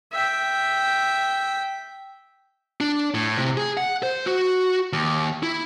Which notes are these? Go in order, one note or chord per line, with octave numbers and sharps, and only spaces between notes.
E5 G5
D4
A2
C3
G#4
F#5
C5
F#4
D#2
E4